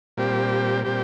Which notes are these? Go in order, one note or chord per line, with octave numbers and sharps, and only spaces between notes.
A#2 G3 C4 G4
A#2 G3 C4 G4